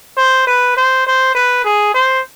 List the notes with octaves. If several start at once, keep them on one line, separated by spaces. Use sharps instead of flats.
C5
B4
C5
C5
B4
G#4
C5